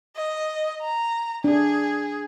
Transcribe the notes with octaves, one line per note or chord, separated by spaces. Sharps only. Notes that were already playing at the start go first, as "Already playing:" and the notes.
D#5
A#5
D4 G#4